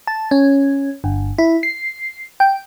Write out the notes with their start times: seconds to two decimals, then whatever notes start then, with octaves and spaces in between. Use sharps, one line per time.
0.07 A5
0.31 C#4
1.04 G1
1.38 E4
1.63 C7
2.40 G5